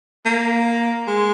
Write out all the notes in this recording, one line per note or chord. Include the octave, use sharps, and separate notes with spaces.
A#3
G#3